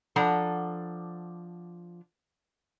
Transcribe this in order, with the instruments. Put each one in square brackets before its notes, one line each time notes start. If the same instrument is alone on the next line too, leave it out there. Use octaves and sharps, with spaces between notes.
[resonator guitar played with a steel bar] F3 D4 A4 F#5 A#5